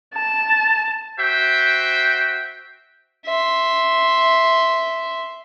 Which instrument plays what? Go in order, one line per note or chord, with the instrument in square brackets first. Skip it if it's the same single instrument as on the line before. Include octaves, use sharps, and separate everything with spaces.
[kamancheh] A5
[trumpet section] F#4 C5 E5 G5
[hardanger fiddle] E5 C6